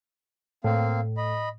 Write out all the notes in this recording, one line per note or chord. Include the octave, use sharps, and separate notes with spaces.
A2 A#3 C4 F5
D#5 B5